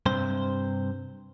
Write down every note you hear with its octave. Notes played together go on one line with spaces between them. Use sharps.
G2 C3 C5